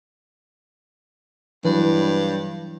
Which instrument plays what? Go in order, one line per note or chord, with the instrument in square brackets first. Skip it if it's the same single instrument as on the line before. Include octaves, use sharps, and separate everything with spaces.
[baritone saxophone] G2 [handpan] E3 F#3 B4